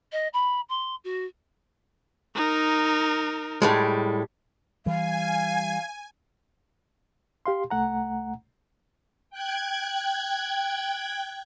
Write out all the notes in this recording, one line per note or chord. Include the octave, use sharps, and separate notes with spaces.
D#5
B5
C6
F#4
D#4 A#4
A2 G3 G#3
E3 G3 F5 G#5
G4 F5 C6
C2 A3 F#5 A#5
G5 F#6 G#6